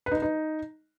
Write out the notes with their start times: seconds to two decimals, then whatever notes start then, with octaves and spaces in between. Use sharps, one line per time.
0.06 B4
0.12 D#4
0.17 B4
0.22 D#4